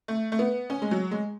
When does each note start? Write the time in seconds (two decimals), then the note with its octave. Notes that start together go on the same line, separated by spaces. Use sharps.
0.08 A3
0.32 A3
0.39 B3
0.70 C#4
0.82 G#3
0.91 F#3
1.11 G#3